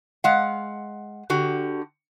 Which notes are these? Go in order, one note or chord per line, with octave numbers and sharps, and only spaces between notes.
G#3 F5 F#5
D3 F#4 G4